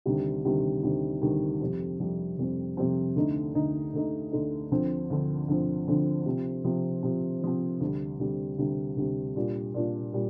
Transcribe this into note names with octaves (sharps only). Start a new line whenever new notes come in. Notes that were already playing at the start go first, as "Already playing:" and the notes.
D2 C3 D#3 G3
D2 C3 D#3 G3
D2 C3 D#3 G3
D2 C3 D#3 G3
F2 C3 G3 C4
F2 C3 G3 C4
F2 C3 G3 C4
F2 C3 G3 C4
D2 D3 A3 D#4
D2 D3 A3 D#4
D2 D3 A3 D#4
D2 D3 A3 D#4
D2 D3 F3 C4
D2 D3 F3 C4
D2 D3 F3 C4
D2 D3 F3 C4
C3 F3 C4
C3 F3 C4
C3 F3 C4
C3 F3 C4
D2 C3 G3
D2 C3 G3
D2 C3 G3
D2 C3 G3
A#2 G3 D4 F4
A#2 G3 D4 F4
A#2 G3